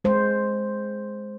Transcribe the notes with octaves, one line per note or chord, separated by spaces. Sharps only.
G#3 C5